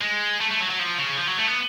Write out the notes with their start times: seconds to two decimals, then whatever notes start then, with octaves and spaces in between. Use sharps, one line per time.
0.02 G#3
0.41 A3
0.51 A3
0.60 F#3
0.70 F#3
0.79 F3
0.98 C#3
1.18 F3
1.27 F#3
1.38 A3
1.47 B3